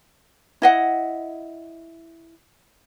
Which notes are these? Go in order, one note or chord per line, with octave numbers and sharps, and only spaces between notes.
E4 D#5 F#5